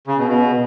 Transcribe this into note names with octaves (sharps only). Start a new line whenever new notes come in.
C#3
B2
B2